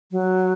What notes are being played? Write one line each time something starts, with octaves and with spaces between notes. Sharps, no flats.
F#3